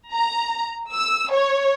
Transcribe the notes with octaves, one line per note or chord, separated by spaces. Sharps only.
A#5
E6
C#5